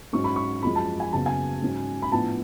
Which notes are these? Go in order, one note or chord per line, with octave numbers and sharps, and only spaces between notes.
G#2 F#3 C#4 C#6
B5
C#6
F#2 F3 G#3 B5
A5
G#5
F#1 F#2 C#3 F#3 B3 A5
G#5
G#2 F#3 C#4
B5
A2 F3 B3 D4 F4 A5